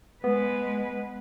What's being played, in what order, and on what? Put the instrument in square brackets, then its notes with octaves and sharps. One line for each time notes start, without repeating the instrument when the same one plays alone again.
[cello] G#3 B4 [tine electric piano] B3